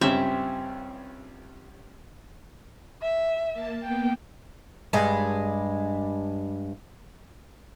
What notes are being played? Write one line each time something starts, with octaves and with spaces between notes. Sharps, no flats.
C#2 G2 C4 C#4 E5
E5
A#3 A5
A#3 B3 G5
G2 G#3